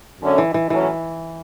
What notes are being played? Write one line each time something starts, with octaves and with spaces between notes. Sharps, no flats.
F#2 D3 A3 C#4
E3
E3
A2 E3 F#3 C#4